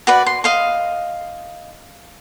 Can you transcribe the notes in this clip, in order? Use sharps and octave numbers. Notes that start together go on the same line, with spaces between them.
F#4 B4 D5
C6
D#5 F5 C6